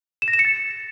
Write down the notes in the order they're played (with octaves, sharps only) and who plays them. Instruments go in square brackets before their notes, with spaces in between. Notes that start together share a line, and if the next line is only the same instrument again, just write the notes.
[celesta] E7
A#6
E7
C#7
A6